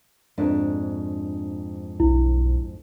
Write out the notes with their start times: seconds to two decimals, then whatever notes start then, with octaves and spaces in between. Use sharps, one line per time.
0.38 F2 G#2 D4
2.00 B1 E4